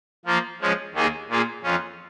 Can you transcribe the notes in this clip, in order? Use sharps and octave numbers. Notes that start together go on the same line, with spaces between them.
F3 A#3 F4
F3 G#3 C#4
D#2 D#3 A#3 D#4 G#4
A#2 A#3 F4 G#4
F2 F3 C#4